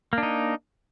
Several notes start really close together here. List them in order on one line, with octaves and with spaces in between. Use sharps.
A#3 D4 D#4